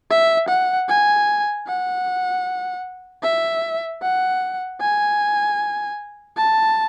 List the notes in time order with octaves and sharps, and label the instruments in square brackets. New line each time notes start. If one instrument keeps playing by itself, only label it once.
[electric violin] E5
F#5
G#5
F#5
E5
F#5
G#5
A5